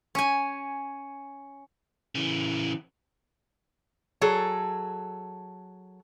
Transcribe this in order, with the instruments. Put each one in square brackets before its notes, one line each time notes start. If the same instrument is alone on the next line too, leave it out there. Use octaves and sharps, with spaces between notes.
[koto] C#4 G#5
[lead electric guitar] C#3 E3
[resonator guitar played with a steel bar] F#3 G#4 A4